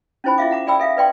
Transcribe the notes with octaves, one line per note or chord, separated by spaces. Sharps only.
C#4 D#4 E4 C5 G#5 B5
E4 F4 G#4 E5 F5 D6
F#5 A#5 D6
G#4 D5 G5 B5 E6
A4 E5 F5
B4 D5 G5 C6